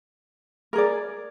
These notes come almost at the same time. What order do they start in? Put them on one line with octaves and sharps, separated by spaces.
A#4 G#4 D5